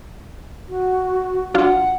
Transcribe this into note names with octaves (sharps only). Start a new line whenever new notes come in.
F#4
F#3 D4 F4 F#5